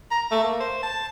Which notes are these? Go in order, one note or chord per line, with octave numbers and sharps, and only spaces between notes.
A#5
A3
A#3
C5
A5